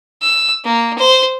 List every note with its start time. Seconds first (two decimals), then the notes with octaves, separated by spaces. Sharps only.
0.22 E6
0.65 A#3
0.98 C5